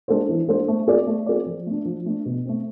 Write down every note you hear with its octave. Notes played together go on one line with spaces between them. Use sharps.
G#3 D4 A4 C5
E3
G#3 D4 A4 C5
A3
C4 G#4 D5
A3
C4 G#4 D5
F3
A3 D4
F3
A3 D4
B2
A3 C4